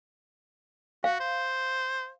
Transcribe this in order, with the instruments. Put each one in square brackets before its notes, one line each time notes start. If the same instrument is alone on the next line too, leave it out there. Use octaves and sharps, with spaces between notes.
[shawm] F#4 [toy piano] F5
[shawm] C5